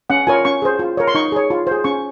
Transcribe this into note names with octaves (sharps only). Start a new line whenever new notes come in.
C#4 F#5
F4 A#4 C#5 G#5
C#4 C#6
G#4 C5
F4
A#4 C#5
C6
D#4 C#6
G#4 C#5
F4
G#4 C5
C#4 C#6